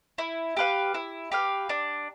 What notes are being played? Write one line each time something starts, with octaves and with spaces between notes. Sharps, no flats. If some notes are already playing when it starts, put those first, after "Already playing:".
E4
G4 B4 F5
E4
G4 B4 F5
D4